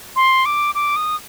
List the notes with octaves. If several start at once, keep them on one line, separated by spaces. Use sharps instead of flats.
C6
D6
D6
D#6